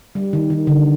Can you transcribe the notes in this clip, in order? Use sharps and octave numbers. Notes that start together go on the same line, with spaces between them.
G3
D#3
D#3
D3